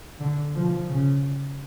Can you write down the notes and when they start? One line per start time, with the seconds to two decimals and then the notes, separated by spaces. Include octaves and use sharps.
0.20 D3
0.55 F3
0.89 C#3